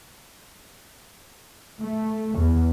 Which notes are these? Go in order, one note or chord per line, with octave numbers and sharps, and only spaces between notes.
A3
E2